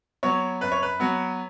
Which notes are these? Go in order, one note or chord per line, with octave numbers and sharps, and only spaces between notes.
F#3 B3 C#5
F#2 B4
C#5
B4
F#3 B3